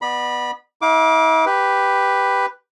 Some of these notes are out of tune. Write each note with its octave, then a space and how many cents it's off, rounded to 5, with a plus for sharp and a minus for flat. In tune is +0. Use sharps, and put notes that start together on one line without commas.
B3 +0 D5 +40 B5 -20
E4 -40 F5 +25 D6 +0
G4 +0 B4 +0